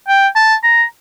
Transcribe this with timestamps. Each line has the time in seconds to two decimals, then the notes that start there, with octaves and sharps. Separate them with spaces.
0.08 G5
0.36 A5
0.64 A#5